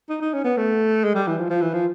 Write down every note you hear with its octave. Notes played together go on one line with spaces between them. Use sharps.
D#4
D#4
C#4
B3
A3
G#3
G3
E3
F3
F3
E3
F3